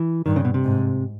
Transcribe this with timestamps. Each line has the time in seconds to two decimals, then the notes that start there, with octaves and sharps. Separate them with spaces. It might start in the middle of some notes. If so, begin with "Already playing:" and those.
Already playing: E3
0.26 G2 D#3
0.36 C#3
0.45 B2
0.54 C3
0.64 G#2